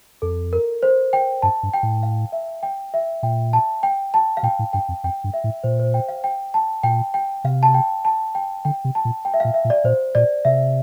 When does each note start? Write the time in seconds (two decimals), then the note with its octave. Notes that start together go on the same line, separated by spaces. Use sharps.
0.22 F2 A4
0.53 A#4
0.83 C5
1.13 G5
1.42 G2 A5
1.63 G2
1.73 G5
1.83 A2
2.03 F5
2.32 E5
2.63 G5
2.94 E5
3.23 A#2 G5
3.53 A5
3.83 G5
4.14 A5
4.37 F5
4.43 A#2 G5
4.59 A2
4.73 G2 G5
4.89 F2
5.04 F2 G5
5.24 G2
5.34 E5
5.44 A2
5.63 A#2 C5
5.79 C5
5.94 G5
6.08 F5
6.24 G5
6.54 A5
6.83 A#2 G5
7.14 G5
7.44 C3 F5
7.63 A5
7.74 G5
8.05 A5
8.35 G5
8.65 D3 G5
8.85 C3
8.95 A5
9.05 A#2
9.25 G5
9.34 E5
9.40 A#2 F5
9.54 E5
9.65 A#2
9.70 D5
9.84 A#2 C5
10.15 A#2 D5
10.45 C3 E5